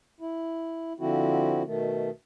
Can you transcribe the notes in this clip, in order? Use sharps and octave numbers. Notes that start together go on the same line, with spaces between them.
E4
D3 F3 C4 E4 F#4
B2 D#3 A3